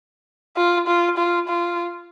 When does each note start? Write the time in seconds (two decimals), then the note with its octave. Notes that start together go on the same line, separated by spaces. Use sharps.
0.56 F4
0.87 F4
1.17 F4
1.48 F4